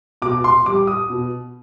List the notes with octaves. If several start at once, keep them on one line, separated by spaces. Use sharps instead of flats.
B2 D6
C6
G3 D6
D#6
B2